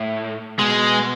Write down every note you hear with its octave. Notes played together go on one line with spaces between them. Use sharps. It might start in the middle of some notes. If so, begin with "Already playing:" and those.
Already playing: A2
B2 G#3